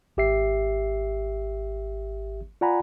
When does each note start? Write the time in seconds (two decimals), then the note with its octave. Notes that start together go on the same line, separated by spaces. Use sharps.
0.17 G#1 G4 E5 C7
2.61 F4 D5 F#5 G#5 A#5 B5